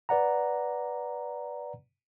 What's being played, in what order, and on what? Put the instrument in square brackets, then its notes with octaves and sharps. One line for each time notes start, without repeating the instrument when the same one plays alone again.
[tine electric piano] B4 D5 F#5 A#5